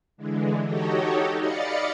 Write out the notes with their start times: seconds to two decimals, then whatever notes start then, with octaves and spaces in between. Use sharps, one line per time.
0.17 D3 E3 G#3
0.65 D#4 F#4 G4 A4 C#5 D#5
1.37 D5 D#5 F5 B5 A6 C#7